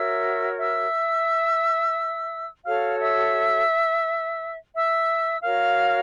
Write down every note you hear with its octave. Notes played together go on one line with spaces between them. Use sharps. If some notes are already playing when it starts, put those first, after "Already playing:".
Already playing: F#4 A#4 C#5 E5 E6
E5 E6
F#4 A4 C#5 F5 F6
E5 E6
E5 E6
F#4 A#4 C#5 F5 F6